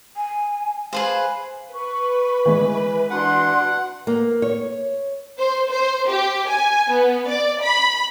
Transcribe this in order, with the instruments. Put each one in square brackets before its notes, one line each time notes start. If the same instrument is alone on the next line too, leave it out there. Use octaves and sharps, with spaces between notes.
[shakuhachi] G#5
[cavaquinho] G#4 B4 C5 [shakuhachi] F5
[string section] B4 [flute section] C#6
[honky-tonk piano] E3 G#3
[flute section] D4 F#4 C6 [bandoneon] F#5
[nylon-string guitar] A#3
C#5
[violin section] C5
C5
G4
G#5
B3
D5
B5